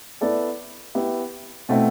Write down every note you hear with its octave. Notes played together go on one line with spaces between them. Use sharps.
B3 E4 A4 D5
B3 E4 G4
B2 A3 C4 E4